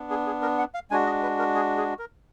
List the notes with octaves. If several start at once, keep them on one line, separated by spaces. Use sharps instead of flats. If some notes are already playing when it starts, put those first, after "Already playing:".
Already playing: B3 D4
G#4
G#4
A#4
F#5
F5
G#3 D4 F#4 G#5
D#5
B4
A#4
G#4
G#4
A#4